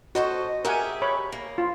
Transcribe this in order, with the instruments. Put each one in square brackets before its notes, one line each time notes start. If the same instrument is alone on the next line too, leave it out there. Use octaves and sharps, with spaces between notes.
[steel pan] F#4 [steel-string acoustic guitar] A4 C5 D#5
[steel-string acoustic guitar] G4 G#4 E5 [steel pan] A#4 F#5 G#5
[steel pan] C#5 B5
[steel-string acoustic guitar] A#3
[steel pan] F4